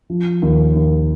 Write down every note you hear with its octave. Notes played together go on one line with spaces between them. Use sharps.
F3
D#2
D#2